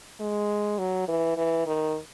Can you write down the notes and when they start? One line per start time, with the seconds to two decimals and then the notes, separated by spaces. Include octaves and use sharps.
0.21 G#3
0.79 F#3
1.08 E3
1.37 E3
1.66 D#3